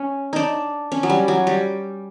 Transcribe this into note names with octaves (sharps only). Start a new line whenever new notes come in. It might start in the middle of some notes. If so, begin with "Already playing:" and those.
Already playing: C#4
D4 D#4
C#4
F#3
G3
F#3
G3